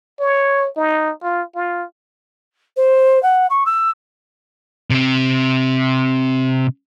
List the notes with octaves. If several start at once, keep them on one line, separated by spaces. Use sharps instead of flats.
C#5
D#4
F4
F4
C5
F#5
C#6
E6
C3 C4